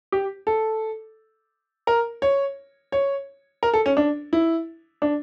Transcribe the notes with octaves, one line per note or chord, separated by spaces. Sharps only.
G4
A4
A#4
C#5
C#5
A#4
A4
C#4
D4
E4
D4